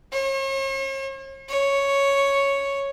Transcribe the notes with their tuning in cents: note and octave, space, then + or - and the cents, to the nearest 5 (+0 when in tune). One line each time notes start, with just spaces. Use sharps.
C#5 -45
C#5 +0